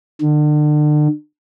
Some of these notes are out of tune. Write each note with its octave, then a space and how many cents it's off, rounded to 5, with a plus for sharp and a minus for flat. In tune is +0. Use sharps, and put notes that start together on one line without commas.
D3 +40